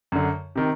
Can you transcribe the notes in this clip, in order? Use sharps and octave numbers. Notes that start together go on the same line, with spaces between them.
F#2 D3
C3 D#3